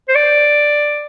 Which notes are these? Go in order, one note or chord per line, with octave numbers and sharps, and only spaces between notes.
C5
D5